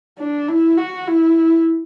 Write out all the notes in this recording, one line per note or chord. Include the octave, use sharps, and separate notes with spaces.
D4
E4
F#4
E4